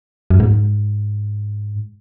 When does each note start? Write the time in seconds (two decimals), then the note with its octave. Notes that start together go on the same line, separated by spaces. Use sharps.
0.30 F#2
0.40 G#2